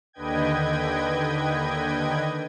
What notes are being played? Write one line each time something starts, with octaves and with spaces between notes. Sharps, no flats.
D#2 D3 B4 D#5 G5 G#6